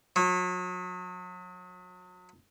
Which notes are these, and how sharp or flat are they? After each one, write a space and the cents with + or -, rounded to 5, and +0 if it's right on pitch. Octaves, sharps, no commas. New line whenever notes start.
F#3 -35